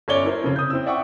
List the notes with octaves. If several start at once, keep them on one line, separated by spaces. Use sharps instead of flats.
G1 C#4 C#5 D5 G7
E4 A#4 C5
F2 C#3
D#6 G6
C4 E4 E6
D5 E5 F#5 G5 C#6